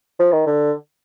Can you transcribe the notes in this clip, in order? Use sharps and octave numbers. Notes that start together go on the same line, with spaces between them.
F3
D#3
D3